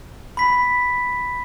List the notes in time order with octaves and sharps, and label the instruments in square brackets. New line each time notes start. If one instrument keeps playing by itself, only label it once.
[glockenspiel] B5 B6